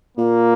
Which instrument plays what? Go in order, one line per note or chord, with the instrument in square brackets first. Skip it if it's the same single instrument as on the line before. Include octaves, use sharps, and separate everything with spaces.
[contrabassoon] A#2 [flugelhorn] A#3